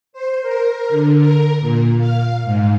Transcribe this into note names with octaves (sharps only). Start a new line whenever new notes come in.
C5
A#4
D3
A#4
A#2
F5
G#2